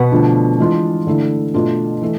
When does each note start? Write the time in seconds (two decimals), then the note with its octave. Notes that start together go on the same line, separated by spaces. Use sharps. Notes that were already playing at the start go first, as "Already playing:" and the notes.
Already playing: B2 B3
0.12 D3 F3 A3 D4 F4
0.58 E3 G#3 D4 F4
1.06 D3 A3 E4
1.54 B2 A3 D4 F4
2.01 E3 A3